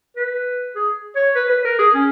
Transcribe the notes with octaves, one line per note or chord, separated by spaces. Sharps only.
B4
G#4
C#5
B4
B4
A#4
G#4
C#4